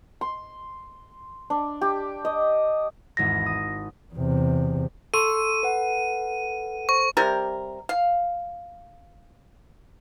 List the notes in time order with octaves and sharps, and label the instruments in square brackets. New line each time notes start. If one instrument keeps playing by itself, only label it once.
[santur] C6
D4
G4
D#5
[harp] G#1 E2 G#6 [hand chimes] A#6
[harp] D#6
[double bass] E2 C3
[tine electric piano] A4 [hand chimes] C6 C#6 E6 [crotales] D#7
[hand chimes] B4 F#5
[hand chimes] C5 [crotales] C#6
[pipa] C3 G3 A#4
F5